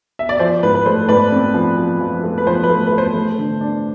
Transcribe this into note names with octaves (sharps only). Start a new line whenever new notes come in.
E5
D5
F3 C5
G#2 B4
B4
A3 C5
G#2 B4 D5
C4
F3
F3
F3
A3
B4
F3 C5
B4
A3
B4
A3
C5
A3
D3
D4